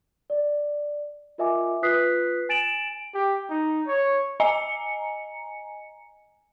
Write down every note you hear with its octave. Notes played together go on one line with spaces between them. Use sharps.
D5
F4 A#4 D#5 E5 G#5 D6
F4 B4 D#6 F#6 B6 C7
G#5 A6 D7 E7 F#7
G4
D#4
C#5
D#5 G#5 A#5 C#7